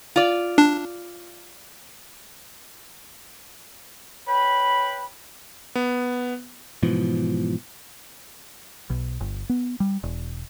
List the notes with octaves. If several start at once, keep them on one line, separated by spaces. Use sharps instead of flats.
F4 D5
D4
B4 C#5 G5 B5
B3
G#2 B2 E3 F3
B1
G1
B3
G3
E1